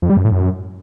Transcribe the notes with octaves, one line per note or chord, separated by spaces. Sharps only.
F2
G3
F#2
A2
F#2